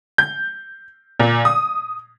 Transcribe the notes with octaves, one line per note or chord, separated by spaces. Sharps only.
G6
A#2
D#6